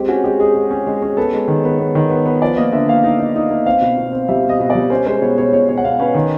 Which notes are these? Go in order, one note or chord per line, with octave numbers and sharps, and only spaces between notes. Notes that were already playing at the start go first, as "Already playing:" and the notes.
Already playing: G#3 C4 G4
C#4 F#4
G#3 G4
G#3 G#4
G#3
C#4
G#3
C#4
B3 A4
G#3
D#3
B3
B3
D#3
B3
B3
F3 D5
A#3 D#5
D3 E5
A#3 F5
D#4
D#4
D#4
A#3
C4 F5
B2
B2
C4
G3 E5
B2
D#5
B2
D5
G3
C#4 C5
G#3 C5
B2 C#5
B2 C#5
B2 C#5
B2 C#5
F#5
B2 F5
C#4 B4
D#3